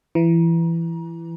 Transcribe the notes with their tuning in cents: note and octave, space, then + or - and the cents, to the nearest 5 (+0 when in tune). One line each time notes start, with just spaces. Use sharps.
E3 +20 A#5 +30